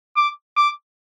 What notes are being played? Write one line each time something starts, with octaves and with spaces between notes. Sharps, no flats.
D6
D6